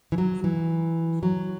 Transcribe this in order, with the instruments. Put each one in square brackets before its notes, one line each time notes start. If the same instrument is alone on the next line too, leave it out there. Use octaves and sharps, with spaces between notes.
[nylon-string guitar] E3
F#3
E3
F#3